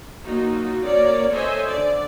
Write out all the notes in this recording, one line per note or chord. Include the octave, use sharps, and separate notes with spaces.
F#3 A#3 D#4 F4 F#4
A#3 C#4 F#4 A#4 C#5 D5
A4 C5 C#5 D#5 E5 G#5
D3 D5